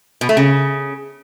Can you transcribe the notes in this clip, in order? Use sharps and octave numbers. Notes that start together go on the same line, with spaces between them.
B2
A3
C#3